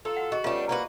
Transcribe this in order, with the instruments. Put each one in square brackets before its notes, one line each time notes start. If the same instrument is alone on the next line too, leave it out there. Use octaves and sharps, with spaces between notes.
[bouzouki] F4 [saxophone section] A4 [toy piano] B4 A#5
[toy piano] F#4 F#5
[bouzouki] F#4 [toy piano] G#4 D#5
[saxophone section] G3 B3 C#4 [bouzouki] A3 D4 [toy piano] F4 C5 C#6
[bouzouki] A#3 F#4 B4